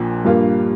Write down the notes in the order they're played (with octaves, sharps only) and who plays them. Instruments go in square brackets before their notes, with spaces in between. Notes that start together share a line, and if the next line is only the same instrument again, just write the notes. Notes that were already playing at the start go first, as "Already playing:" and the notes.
Already playing: [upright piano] A#1 A#2 F3
G2 G3 A#3 F4